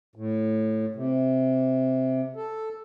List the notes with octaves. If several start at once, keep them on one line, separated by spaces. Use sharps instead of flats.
A2
C3
A4